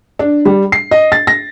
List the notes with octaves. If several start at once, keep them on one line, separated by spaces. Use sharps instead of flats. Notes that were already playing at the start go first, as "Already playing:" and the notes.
D4
G3
C7
D#5
A6
A#6